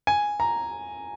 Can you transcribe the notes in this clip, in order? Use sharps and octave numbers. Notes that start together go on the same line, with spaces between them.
G#5
A#5